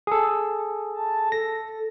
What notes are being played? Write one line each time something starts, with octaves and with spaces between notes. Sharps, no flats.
G#4 A4
A5
A4 A#6